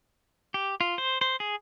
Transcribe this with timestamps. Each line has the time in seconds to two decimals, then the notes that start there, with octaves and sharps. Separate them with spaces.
0.54 G4
0.81 F4
0.98 C5
1.21 C5
1.40 G#4